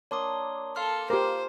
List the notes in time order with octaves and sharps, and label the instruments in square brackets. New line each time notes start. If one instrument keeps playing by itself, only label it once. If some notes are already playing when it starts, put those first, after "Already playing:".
[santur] A#3 D4 A5 [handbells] C#5 C6 D#6
[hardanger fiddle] A4 [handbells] F5 C6 F6
[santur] A#3 F4 G#5 [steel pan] G4 A#4 [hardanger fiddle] C5